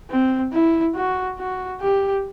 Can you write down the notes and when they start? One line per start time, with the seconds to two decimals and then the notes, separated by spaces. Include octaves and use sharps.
0.10 C4
0.53 E4
0.95 F#4
1.38 F#4
1.81 G4